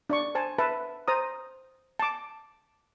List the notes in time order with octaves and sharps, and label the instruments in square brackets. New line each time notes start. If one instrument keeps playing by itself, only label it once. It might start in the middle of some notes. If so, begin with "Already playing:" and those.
[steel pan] D4 D5 C#6
C5 G#5 A5
B4 E5 A5
C5 A#5 D#6
A5 D6